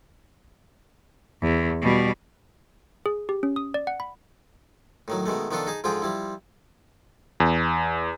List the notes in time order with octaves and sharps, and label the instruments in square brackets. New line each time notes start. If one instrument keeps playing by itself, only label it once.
[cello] E2
B2 G3
[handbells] G#4
G4
C#4
D#6
D5
F#5
B5
[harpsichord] A2 D#3 F#3
B2 D#3 G#3 A3
D#3 F3 B3 D4 F4 A4
D#4 G#4 A5
G#2 D3 F3 F4 G#4 G5
F3 G3 E4
[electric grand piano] E2